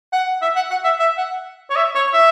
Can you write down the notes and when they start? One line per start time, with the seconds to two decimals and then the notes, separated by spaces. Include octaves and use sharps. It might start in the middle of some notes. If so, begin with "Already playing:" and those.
0.13 F#5
0.42 E5
0.56 F#5
0.70 F#5
0.84 E5
1.00 E5
1.18 F#5
1.70 C#5
1.76 E5
1.95 C#5
2.13 E5